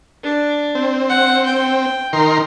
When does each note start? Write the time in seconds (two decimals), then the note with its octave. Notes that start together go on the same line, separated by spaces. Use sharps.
0.23 D4
0.75 C4
1.10 F#5
1.46 G5
2.13 D#3 A#4 C6